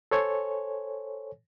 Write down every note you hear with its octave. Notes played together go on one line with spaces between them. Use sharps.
A4 C5 C#5 G#5